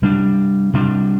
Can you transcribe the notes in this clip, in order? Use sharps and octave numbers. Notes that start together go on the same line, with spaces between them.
C3 G3 D4
C3 G3 D4